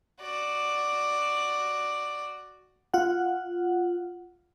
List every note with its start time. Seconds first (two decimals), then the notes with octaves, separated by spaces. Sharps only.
0.21 F#4 D5
2.94 F4 F#5